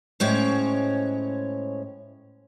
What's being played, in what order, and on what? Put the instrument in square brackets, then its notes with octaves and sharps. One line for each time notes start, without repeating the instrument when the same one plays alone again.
[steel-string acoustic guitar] A2 G#3 C#4 C5 C#5